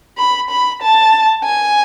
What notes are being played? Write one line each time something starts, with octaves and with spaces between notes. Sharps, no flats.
B5
B5
A5
G#5